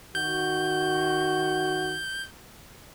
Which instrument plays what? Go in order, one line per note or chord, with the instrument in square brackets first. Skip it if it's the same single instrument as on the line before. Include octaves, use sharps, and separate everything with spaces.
[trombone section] D#3 F#4 [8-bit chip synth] G6